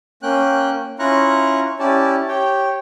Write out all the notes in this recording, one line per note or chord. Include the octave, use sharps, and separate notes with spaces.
A#3 C#4 G5 F#6
C#4 E4 F4 A#5 C#6 F#6
C#4 E4 G4 D5 A5
G4 C#5 G5